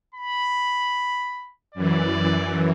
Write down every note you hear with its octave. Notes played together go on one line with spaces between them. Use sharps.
B5
F#2 E3 D5